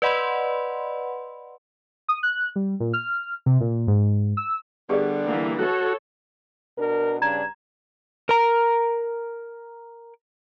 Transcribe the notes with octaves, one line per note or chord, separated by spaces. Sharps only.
B4 D5 D#5 F#5 B5 C6
D#6
F#6
G3
A#2
F6
C3
A#2
G#2
E6
D3 G3 B3 G4 G#4 D5
E3 A#3
F#4 A4 C#5
B2 D4 A#4
G2 C#3 D4 A#5 G#6 E7
A#4 A#5